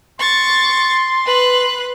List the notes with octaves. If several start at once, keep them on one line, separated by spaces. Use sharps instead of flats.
C6 C#6 A6
B4 F#6